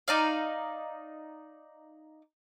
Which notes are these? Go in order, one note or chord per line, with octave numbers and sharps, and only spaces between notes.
D#4 D5 F5